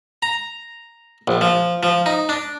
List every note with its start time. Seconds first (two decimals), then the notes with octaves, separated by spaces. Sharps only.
0.22 A#5
1.28 A#1
1.41 F3
1.83 F3
2.06 D#4
2.29 D4